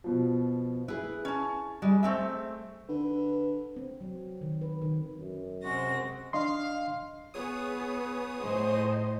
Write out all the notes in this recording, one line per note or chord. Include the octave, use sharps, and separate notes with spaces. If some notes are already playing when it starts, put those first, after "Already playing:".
B2 F3
E4 G#4 B4
C#4 A5
G3 G#3
A3 C4 G#4 E5
D3 B4
C4
F#3
D#3
B4
D#3
F#2
C3 G#3 C4 F#4 A#6
D4 D#5 F5 C6
B3 G#4 C#5 D#6
A2 C5 D#5